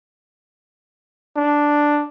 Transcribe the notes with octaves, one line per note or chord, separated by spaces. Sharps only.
D4